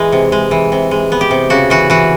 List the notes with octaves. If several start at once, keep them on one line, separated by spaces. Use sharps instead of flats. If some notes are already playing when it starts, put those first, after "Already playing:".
Already playing: E3 G#3
C3
G#3
E3
C3
G#3
B3
G4
C3
C#3 F#4
E3 F#4
E3 F#4